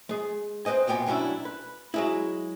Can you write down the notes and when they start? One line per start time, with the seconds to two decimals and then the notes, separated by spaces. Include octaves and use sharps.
0.09 G#3 G#4
0.65 C4 B4 C5 D#5 G#5
0.87 B1 A#2 B3 G5 G#5
1.06 B2 F#3 C#4 D4 E4
1.45 B4
1.94 F#3 G#3 E4